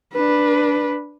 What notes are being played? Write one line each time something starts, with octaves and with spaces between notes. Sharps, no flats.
D4 B4